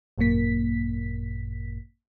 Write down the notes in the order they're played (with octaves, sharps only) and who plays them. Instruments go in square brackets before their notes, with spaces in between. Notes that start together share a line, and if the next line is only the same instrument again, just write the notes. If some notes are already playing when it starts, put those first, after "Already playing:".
[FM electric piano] G#1 F#2 A#2 A#3 B6